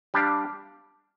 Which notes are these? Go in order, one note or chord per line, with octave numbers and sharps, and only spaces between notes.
G3 D4 G4 D5 F5